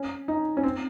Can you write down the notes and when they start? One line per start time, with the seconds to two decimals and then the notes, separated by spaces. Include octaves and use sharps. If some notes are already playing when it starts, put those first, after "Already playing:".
Already playing: C#4
0.28 D#4
0.57 C#4
0.63 C4